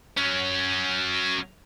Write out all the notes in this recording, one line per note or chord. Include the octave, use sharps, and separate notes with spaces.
F#3 C#4